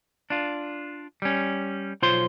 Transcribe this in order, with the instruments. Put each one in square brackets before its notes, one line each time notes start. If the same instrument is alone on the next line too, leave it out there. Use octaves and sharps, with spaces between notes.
[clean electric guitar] D4 F4
G3 C#4
B1 F4 C5 C#5 C6